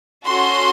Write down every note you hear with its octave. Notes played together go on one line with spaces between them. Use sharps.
C#4 F#4 A4 C6